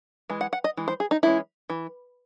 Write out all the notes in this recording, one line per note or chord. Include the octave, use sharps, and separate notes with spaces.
E3 G#3
F#5
F#5
D#5
E3 G#3
C5
G#4
D#4
E3 G#3 C#4 E4
E3